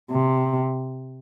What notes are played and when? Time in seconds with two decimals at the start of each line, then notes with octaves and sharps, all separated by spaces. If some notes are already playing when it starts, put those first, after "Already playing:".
0.11 C3